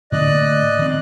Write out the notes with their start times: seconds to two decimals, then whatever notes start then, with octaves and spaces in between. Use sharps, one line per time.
0.12 A2 D3 A#3 D5 D#5 F#6
0.79 D#3 C4